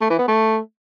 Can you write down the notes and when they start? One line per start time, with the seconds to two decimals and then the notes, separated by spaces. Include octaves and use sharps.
0.01 A3
0.10 E3
0.19 B3
0.28 A3